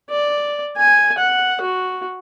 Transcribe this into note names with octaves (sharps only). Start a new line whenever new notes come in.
D5
G#5
F#5
F#4